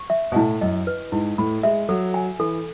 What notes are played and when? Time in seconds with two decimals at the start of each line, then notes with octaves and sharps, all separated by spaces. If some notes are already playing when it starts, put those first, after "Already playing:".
Already playing: C#6
0.10 E5
0.32 B2
0.36 A2 E4
0.61 F#2 D#5
0.87 B4
1.12 G#2 E4
1.38 A2 B5
1.63 G#3 E5
1.89 F#3 A4
2.14 G#5
2.39 E3 A4